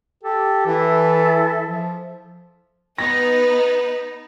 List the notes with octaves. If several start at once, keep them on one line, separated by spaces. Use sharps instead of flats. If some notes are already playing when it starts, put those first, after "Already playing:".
G4 A4
E3 E4 A4 E5
F3
B3 D#4 B4 A#6